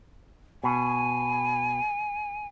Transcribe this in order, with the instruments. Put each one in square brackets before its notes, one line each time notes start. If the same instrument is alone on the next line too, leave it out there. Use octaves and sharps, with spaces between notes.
[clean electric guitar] B2 [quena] G#5